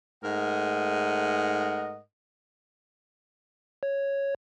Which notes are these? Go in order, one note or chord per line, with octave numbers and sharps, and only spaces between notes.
G#2 A3 A#4 D#5 F#5
C#5